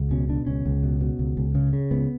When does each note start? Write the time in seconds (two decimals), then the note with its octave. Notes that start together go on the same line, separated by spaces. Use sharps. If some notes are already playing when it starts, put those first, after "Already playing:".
Already playing: C#2
0.11 B2 C#4
0.29 B2 D4
0.47 C#2 C#4
0.65 C#2
0.83 B2
1.01 B2
1.19 C#2
1.37 C#2
1.55 C#3
1.73 C#3
1.91 C#2 B3